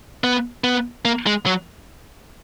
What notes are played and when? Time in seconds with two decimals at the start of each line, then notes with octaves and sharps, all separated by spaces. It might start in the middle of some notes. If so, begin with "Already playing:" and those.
0.24 B3
0.64 B3
1.05 A#3
1.26 G#3
1.46 F#3